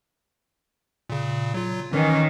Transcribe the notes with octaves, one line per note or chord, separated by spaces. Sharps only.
A#2 C#3
F#3 F4
D#3 E3 C#4